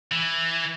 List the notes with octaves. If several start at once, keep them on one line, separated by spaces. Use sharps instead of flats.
E3